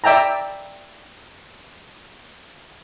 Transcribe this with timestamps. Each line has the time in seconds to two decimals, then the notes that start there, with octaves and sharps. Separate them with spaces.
0.04 D5 E5 G5 A5 A#5